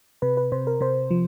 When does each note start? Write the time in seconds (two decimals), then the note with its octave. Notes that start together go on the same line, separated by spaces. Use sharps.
0.22 C3 B4
0.37 B4
0.52 C3 C5
0.67 A#4
0.81 C3 C5
1.11 F3